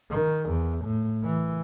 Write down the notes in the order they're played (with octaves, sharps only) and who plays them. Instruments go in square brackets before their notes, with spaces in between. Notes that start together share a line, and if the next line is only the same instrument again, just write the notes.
[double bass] D#3
E2
A2
E3